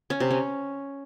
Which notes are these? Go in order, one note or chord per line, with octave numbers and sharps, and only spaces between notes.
C#4
C3
C#4